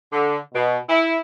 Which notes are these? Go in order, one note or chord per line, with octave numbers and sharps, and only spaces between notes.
D3
B2
E4